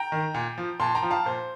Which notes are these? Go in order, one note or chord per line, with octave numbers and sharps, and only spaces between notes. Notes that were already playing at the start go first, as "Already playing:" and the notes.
Already playing: G5 A#5
D#3
A#2
F3
A#2 A5 C6
G5 A#5
F3
F5 A5
A#2 C5